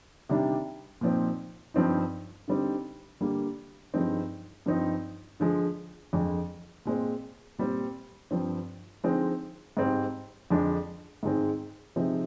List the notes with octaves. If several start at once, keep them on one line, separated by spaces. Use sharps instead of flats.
C3 D#3 G3 D4
A#2 F3 C4 D#4
G2 F3 C4 D#4
D3 G3 C4 D#4
D3 G3 A#3
G2 F3 G#3 C4 D#4
G2 F3 C4 D#4
D3 F3 G#3
F2 D3 F3 G#3
A#2 G#3 C4
A#2 G3 C4
G2 F3 C4
D3 F3 G#3 C4 D#4
G#2 G3 C4
F2 D3 F3 G#3 D4
G#2 D#3 G#3 C4
C3 F3 G#3 C4 D#4